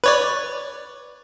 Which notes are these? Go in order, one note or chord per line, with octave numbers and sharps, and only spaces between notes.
B4 C#5 D5